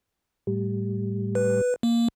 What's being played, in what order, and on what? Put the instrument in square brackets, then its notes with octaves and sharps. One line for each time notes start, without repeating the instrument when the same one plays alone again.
[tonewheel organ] A2 G3
[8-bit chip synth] B4
A#3